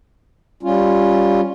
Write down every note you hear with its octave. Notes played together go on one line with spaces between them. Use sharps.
G3 C#4 F4